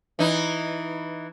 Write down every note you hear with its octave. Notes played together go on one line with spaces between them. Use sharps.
E3 D#4